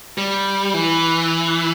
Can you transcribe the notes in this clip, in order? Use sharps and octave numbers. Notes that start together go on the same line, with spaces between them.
G3
E3